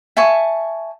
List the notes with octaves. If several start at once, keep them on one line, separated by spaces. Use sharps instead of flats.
E5 G#5 A5 C#6